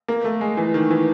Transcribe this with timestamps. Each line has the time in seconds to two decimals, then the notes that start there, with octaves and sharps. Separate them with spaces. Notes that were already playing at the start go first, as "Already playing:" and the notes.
0.08 A#3
0.24 A3
0.41 G#3
0.57 E3
0.74 D#3
0.91 E3